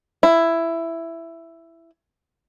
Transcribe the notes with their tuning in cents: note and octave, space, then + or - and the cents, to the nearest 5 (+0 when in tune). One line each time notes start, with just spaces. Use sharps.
E4 +10